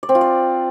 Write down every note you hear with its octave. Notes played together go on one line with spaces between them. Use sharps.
D5
C4
F4
D5